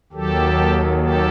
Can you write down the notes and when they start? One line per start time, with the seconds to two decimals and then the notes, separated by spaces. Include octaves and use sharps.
0.12 D#2 D#3 F#3 G4 A4
0.99 G4 A4